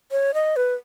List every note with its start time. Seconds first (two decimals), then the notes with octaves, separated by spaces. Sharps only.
0.12 C#5
0.34 D#5
0.56 B4